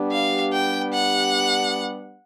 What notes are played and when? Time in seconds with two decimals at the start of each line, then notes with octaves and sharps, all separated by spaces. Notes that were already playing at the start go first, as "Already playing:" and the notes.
Already playing: G3 B3 D4 G4
0.12 F5
0.53 G5
0.93 F#5